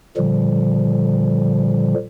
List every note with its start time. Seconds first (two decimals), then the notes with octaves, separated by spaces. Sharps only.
0.17 A#2 D3 F3 G3